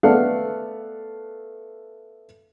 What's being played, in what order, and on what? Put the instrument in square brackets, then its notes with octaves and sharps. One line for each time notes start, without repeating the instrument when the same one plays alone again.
[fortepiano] A3 B3 A4 D5 F5 F#5